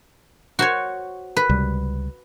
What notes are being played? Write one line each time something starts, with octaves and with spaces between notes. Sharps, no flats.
F#4 C5 C#5
B4
C#2 C3 G3